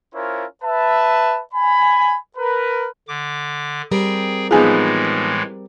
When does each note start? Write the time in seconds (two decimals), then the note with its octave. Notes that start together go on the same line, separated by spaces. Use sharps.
0.14 C#4 E4 F4 A#4 C5 C#5
0.63 B4 E5 A5
1.54 G#5 B5
2.37 A#4 B4
3.08 D3 D6
3.92 G3 C4 G#4 A#4 G5
4.51 A2 E3 F3 G#3 B3 D#4 G#4 G#5